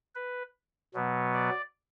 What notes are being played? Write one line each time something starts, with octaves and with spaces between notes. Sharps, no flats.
B4
B2 F#3 B3
D5